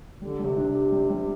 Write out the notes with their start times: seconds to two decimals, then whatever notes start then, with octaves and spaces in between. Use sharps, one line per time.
0.21 D3 G3
0.39 G3
0.45 C3
0.57 D4
0.68 C3
0.75 G4
0.92 G3
1.10 G3